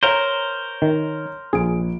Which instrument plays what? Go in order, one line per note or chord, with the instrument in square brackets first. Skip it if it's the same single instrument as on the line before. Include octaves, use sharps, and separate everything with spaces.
[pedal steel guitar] A#4 C5 [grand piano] C#5 A#5
[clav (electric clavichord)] D#3
[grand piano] A#1 D7 [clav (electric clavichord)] G#4